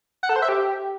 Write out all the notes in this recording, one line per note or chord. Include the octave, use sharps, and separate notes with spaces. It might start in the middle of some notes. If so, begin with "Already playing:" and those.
F#5
A4
C5
E5
G4